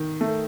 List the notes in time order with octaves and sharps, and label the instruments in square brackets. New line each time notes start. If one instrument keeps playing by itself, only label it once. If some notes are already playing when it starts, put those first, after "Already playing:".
Already playing: [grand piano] D#3
A3